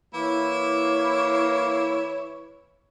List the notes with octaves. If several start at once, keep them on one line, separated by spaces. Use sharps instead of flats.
E3 A#3 E4 C#5